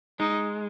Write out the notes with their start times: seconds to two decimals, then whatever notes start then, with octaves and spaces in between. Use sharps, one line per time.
0.20 G#3 D#4